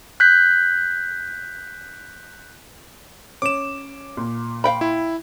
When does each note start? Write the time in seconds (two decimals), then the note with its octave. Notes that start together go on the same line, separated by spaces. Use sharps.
0.20 F#6 G6 B6
3.42 C#4 D6 E7
4.17 A#2
4.64 F5 G5 B5
4.81 E4